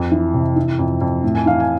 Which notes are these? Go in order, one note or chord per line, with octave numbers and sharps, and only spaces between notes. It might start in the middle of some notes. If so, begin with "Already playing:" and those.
Already playing: F2
E3
C3
E3
F2
F2
A2
G#5
E3 F5
G#5